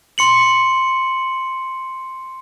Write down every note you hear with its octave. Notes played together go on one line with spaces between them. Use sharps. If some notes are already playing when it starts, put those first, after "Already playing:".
C6 C#7 F#7